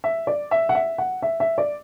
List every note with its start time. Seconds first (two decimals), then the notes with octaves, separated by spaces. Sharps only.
0.04 E5
0.27 D5
0.51 E5
0.69 F#5
0.75 E5
0.98 F#5
1.22 E5
1.40 E5
1.58 D5